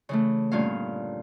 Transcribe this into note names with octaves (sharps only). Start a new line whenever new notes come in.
C#3 E3 A3
D2 G2 A#2 B3 C#4 F5